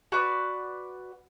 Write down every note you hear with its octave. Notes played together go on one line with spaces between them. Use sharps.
F#4 B4 D5